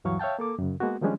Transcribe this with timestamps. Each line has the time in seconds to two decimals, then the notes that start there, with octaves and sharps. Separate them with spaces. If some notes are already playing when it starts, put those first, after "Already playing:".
0.04 D2 G2 E3 F#3 F5 C#6
0.19 C#5 E5 F5 G5 A5
0.39 A#3 A4 D6
0.59 F#2 C#3
0.80 G#3 A#3 B3 F#4
1.01 D#3 F3 G3 G#3 C#4 D4